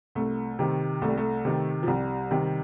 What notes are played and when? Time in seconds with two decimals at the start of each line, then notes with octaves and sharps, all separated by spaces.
0.15 C2 A3
0.59 C3 D#3
1.02 C2 A3
1.09 G3
1.17 A3
1.45 C3 D#3
1.83 F3
1.87 C2 G3
2.31 C3 D#3